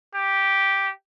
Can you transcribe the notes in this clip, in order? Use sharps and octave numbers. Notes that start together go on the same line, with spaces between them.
G4